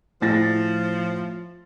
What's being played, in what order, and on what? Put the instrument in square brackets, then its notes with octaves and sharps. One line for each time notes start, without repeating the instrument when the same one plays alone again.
[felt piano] A2 A6 A#6 [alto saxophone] F3